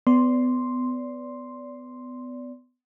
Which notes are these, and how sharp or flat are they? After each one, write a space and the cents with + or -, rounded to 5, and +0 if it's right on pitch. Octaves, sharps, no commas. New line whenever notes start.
B3 +25 D5 -25 C6 +0